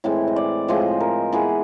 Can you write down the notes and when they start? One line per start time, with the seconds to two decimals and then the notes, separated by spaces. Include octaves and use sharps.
0.04 A2 E3 G#3 C4
0.28 D#5
0.36 D5
0.68 A2 F3 G#3 C4 D#5
1.00 A#4
1.33 E3 G#3 B3 G#4